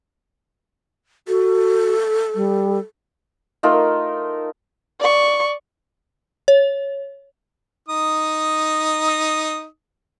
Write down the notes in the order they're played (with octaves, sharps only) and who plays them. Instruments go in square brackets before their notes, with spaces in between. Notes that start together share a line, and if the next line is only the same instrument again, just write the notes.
[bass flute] F#4 [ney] A4
[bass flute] G3
[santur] A3 D#4 F4 A#4
[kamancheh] D5 C#6
[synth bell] C#5
[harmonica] D#4 D#6